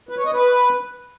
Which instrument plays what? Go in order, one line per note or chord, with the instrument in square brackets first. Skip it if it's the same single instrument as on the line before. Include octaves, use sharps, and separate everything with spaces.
[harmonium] B4
C#5
D#5
B4